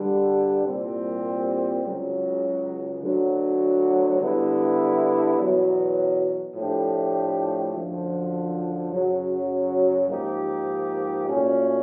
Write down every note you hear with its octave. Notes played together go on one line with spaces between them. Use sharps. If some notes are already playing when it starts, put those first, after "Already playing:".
Already playing: G2 D3 G3
C2 A#2 G3 C4
C#2 C#3 F#3
D2 D3 F#3
D3 G3 B3 E4
E2 B2 F#3
A2 F3 A3 D4 G4
F#2 D3 F3
F#2 C#3 F#3
G#2 F3 A#3 D#4 G4
A#2 F#3 A3 C#4